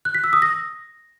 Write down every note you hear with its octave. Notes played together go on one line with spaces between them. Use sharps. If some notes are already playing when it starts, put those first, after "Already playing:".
F#6
B6
E6
D#6
A#6